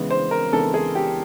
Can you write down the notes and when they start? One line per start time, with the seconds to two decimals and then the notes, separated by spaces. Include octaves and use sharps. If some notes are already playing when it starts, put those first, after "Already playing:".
Already playing: C#3 E3 G#3 B3
0.10 C5
0.31 A#4
0.52 C#3 E3 G#3 B3 A4
0.74 G#4
0.95 G4